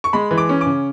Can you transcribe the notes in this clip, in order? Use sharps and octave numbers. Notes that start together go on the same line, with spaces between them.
C#6
G#3 B5
E3
D6
C#4
D6
C#3